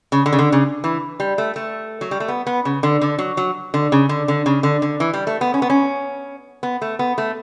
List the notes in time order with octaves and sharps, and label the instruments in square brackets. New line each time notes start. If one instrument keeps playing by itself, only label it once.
[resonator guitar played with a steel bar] C#3
D3
C#3
D3
C#3
E3
G3
A3
A3
F#3
G3
A3
B3
B3
C#3
D3
D3
F#3
F#3
D3
C#3
D3
D3
C#3
D3
D3
E3
G3
A3
B3
C#4
B3
C#4
B3
A3
B3
A3